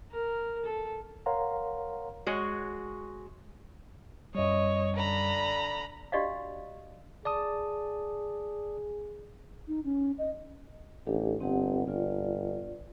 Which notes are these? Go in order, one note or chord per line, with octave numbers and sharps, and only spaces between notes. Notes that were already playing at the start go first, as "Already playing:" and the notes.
A#4
A4
A#4 C#5 F5 F#5 A#5 C6
G#3 F#4 C#5
F#2 G3 C#5 D#5
D3 A#5 B5
D4 F#4 G4 D5 D#5 F5
G#4 D5 A5 D#6
D#4
C#4
D#5
A1 D4 G4 A4
G1 C4 G4 F#5
G1 F4 D5